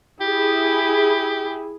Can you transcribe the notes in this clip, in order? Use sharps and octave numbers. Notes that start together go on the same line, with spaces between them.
E4 G4 G#4